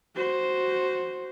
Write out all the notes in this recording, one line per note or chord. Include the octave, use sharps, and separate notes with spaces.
F#4 C5